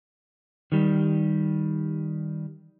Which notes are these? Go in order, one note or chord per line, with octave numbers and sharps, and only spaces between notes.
D#3 G3